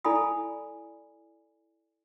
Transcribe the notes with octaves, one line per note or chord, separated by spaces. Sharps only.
E4 A4 D5 G#5 B5 D#6